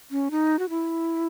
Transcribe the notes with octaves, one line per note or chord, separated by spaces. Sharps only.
C#4
D#4
F#4
E4